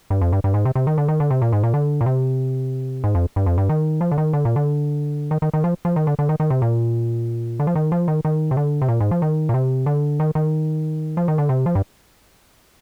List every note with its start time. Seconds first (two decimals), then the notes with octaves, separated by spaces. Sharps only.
0.10 G2
0.21 F2
0.33 G2
0.44 G2
0.54 G#2
0.65 C3
0.75 C3
0.87 D#3
0.98 D3
1.08 D#3
1.20 D3
1.30 C3
1.42 A#2
1.53 G#2
1.63 A#2
1.74 D3
2.01 A#2
2.06 C3
3.04 G#2
3.15 F2
3.36 G2
3.46 F2
3.58 G2
3.69 D#3
4.01 F3
4.11 D3
4.18 D#3
4.33 D3
4.45 A#2
4.56 D3
5.31 D#3
5.42 D#3
5.54 D#3
5.64 F3
5.85 F3
5.96 D#3
6.07 D3
6.19 D3
6.29 D#3
6.40 D#3
6.50 C3
6.62 A#2
7.60 D3
7.67 F3
7.75 D#3
7.92 F3
8.08 D#3
8.25 D#3
8.51 C3
8.57 D3
8.82 C3
8.88 A#2
9.00 G#2
9.11 F3
9.22 D#3
9.49 A#2
9.54 C3
9.86 D3
10.20 D#3
10.35 D#3
11.17 F3
11.28 D#3
11.38 D3
11.49 C3
11.66 F3
11.75 G2